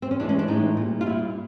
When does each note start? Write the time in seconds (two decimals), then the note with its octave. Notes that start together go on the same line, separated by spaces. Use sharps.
0.02 C4
0.11 C#4
0.19 A2 E3 G#3 D4
0.29 C#4
0.39 D4
0.48 A2 E3 G#3 D#4
0.77 A#2 G3
1.01 F4
1.06 A#2 G3 E4